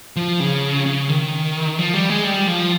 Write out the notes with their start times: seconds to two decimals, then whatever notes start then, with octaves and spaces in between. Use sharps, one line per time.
0.16 F3
0.40 C#3
0.86 C#3
1.09 D#3
1.79 F3
1.94 G3
2.09 G#3
2.24 G3
2.48 F3